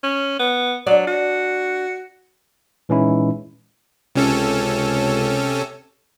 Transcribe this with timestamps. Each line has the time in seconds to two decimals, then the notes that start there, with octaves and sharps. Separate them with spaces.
0.03 C#4
0.39 B3
0.87 F#3 D4 D5
1.07 F#4
2.89 A#2 E3 G#3 C#4 D#4 E4
4.16 C#2 C3 C#4 A4